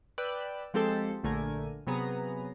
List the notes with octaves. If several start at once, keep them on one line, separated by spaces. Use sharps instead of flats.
B4 D5 G5 E6 F#6
F3 G#3 C4 G4 A4 C5
A#1 D3 A3 A#4 G#5
C3 F#3 B3 G#4 A#5